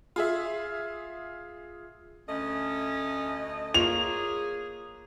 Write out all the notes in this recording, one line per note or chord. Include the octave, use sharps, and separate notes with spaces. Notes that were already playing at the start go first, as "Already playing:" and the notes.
F4 G#4 E5
D2 A3 C#4 D#5
A#3 F4 G#4 C#5 F7